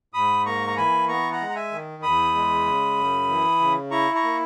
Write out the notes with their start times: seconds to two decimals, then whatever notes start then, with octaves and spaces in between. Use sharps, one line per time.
0.14 G#2 B5 D#6
0.46 A#3 A#5 C#6
0.67 A#5
0.77 E3 G#5 B5
1.08 B3 A#5 C#6
1.32 F#5 A#5
1.40 G#3
1.49 A#5
1.56 E5 G#5
1.72 D#3
2.03 E2 B5 D#6
2.34 G#3
2.66 C#3
2.97 F#2
3.28 E3
3.60 C#3
3.91 E4 A#5 C#6
4.15 A#5 C#6
4.23 A#3